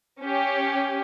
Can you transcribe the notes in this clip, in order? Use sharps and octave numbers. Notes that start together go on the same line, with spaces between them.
C#4 G4